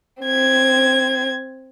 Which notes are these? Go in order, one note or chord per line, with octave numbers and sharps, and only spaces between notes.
C4 G#6